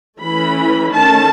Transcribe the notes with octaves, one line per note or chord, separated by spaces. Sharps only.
E3 A3 C#4 B5
D#3 A3 C#4 A5